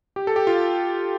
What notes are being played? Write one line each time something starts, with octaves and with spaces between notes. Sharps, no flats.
G4
A4
G4
F4